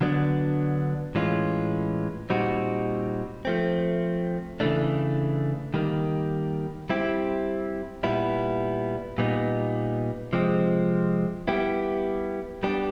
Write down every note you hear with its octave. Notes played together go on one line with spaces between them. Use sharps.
D3 F#3 B3 D4
A2 E3 G#3 C#4 F4
A#2 G3 C4 D#4 F#4
F3 A3 C4
C#3 E3 A3 D4
D#3 G3 A#3
G3 C4 E4 G4
A#2 G3 B3 E4
A#2 G3 B3 D#4
C3 F3 G#3 C4
G3 B3 E4 G4
G3 B3 D4 G4